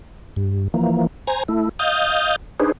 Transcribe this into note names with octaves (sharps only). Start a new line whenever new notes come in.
G2
E3 F3 A#3
C5 G#5 A#5
A3 E4
D#5 F5 D#6 G6 A6
D4 D#4 G#4 B4 C5